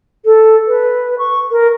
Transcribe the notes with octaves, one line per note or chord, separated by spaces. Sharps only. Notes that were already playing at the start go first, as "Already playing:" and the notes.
A4
B4
C#6
A#4